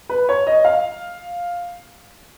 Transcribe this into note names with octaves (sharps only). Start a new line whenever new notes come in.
B4
C#5
D#5
F5